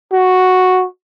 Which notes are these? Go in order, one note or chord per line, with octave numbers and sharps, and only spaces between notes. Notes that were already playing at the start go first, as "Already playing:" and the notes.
F#4